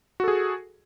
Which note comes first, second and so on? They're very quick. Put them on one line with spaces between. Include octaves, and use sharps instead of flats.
F#4 A4 G#4